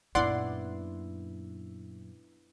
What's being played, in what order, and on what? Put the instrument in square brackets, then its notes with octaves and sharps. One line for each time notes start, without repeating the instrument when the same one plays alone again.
[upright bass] F#2 A#2 [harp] B3 D4 E4 [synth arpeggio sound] D5 F#5 C6